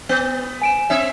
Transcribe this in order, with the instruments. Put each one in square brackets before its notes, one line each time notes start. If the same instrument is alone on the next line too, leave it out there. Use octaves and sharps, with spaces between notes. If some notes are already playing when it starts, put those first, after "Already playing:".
[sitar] B3
[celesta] G#5 D7 E7
[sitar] C4 E5